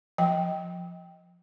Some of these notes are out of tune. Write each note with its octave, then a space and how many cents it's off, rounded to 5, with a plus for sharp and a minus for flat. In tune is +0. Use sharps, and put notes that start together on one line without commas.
F3 +0 G5 +0